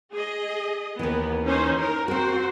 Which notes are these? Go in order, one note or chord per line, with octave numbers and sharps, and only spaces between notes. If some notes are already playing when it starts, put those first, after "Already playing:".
G#4 D#5
D#2 E3 B3
C#4 D#4 C5
A#4
C4 F#4 A#4 C5